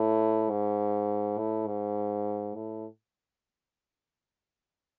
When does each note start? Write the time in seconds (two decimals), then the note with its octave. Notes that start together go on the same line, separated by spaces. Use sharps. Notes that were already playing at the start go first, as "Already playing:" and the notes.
Already playing: A2
0.50 G#2
1.38 A2
1.67 G#2
2.55 A2